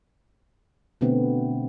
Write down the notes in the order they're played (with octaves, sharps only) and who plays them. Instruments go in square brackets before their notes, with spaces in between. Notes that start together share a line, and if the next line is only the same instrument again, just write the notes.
[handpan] B2 D3 A3 B3 C4